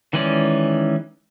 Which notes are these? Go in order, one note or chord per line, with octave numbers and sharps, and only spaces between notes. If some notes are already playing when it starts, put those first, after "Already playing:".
D#3 E3 G#3 C#4 D5